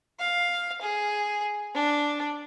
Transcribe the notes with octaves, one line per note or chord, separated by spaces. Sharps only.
F5
G#4
D4